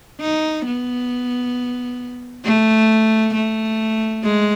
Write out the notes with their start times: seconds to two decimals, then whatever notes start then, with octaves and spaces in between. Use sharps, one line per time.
0.20 D#4
0.66 B3
2.45 A3
3.34 A3
4.23 G#3